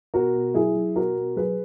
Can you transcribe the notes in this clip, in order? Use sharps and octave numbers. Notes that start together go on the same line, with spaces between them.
B2 F#4 A#4
B2
F#3 E4 G#4
F#3
B2 F#4 A#4
B2
F#3 G#4 B4